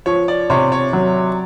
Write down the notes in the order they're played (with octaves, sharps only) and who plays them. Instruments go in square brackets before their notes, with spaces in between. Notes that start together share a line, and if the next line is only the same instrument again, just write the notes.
[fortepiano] F3 [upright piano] C#5
[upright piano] D5
[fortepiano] C3 [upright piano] C#5
[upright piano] C#5
[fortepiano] F#3